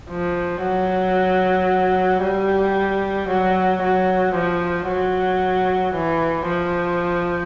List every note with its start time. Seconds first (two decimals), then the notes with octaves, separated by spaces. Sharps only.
0.10 F3
0.63 F#3
2.23 G3
3.29 F#3
3.82 F#3
4.35 F3
4.88 F#3
5.94 E3
6.47 F3